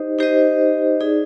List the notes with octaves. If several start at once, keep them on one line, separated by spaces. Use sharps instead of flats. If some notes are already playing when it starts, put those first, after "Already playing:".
Already playing: D#4 G4 C5 D#5
D#4 G4 C5 D#5
D#4 G#4 D5